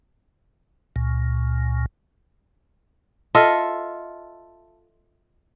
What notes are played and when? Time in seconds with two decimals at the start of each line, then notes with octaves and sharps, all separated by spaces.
0.96 C#2 A#2
3.35 F4 A4 D#5 E5